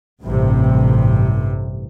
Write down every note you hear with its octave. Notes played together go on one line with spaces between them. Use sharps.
A1 G2 C3